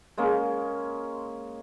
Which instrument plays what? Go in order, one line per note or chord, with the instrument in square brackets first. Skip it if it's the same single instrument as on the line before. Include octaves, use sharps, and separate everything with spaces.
[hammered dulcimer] G#3 A#3 C#4